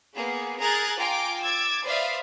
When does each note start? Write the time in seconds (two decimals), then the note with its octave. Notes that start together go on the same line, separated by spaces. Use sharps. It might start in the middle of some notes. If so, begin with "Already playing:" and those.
0.15 A#3 B3 G#4
0.60 G#4 A#4 A#5 F#6 G#6 A6
0.99 F4 G5 G#5 A#5 D6
1.42 D6 E6 G#6 A6
1.84 B4 C5 D5 E5 F5 D#6